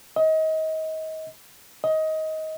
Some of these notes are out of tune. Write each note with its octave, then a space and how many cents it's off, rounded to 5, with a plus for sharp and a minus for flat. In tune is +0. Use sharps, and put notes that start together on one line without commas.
D#5 +30
D#5 +20